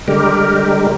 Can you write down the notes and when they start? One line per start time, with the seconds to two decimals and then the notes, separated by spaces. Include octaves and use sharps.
0.08 D3 G3 G#3 G4 A#4